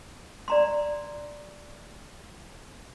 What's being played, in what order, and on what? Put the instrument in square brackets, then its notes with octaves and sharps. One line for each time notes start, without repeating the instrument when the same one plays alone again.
[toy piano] D5 A#5 C6